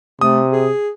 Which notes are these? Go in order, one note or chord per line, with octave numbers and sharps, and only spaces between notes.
C3 A3 D#6
G#4